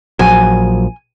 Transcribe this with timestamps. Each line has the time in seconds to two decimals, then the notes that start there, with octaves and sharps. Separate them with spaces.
0.19 A#1 F3 F#3 G#5